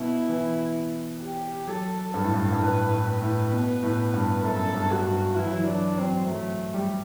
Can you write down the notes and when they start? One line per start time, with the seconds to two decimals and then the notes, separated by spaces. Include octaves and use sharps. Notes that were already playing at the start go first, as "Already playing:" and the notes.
Already playing: B2 E4
0.29 E3
1.22 G4
1.67 F#3 A4
2.14 G2 A4
2.24 A2
2.34 G2
2.52 G2
2.60 A2 B4
2.90 A2
3.05 B4
3.22 A2
3.52 B2
3.83 A2
4.14 G2
4.44 F#2 A4
4.74 G2
4.91 F#4
5.05 G2
5.36 E3 E4
5.46 F#3
5.57 E3
5.67 F#3 D4
5.98 F#3 C4
6.28 F#3 A3
6.74 G3